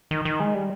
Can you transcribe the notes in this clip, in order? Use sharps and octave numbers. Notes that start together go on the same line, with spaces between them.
D#3
D#3
G#3
G3